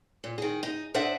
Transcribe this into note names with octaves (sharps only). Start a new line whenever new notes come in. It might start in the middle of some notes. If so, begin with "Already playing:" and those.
A#2
D#3 G#4
D#4
D4 C5 D#5 E5 F#5